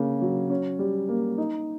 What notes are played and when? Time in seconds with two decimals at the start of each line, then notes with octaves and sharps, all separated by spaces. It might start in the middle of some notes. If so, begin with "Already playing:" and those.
Already playing: C#3 A#3
0.21 F#3
0.50 C#4
0.79 G3
1.09 A#3
1.38 D#4